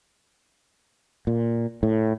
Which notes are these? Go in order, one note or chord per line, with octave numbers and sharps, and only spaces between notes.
A#2
A2